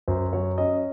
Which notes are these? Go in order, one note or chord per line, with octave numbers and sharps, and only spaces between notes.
F#2 C5
F#3 C#5
C#4 D#5